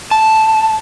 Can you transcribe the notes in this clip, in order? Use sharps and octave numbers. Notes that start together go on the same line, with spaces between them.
A5